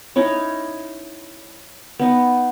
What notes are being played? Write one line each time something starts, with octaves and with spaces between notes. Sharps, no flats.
C#4 D#4 E4 C#5
B3 D#4